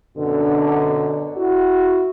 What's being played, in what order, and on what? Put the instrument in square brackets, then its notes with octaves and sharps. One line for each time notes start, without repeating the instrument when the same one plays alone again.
[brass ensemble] F#2 B2 D3
E4 F#4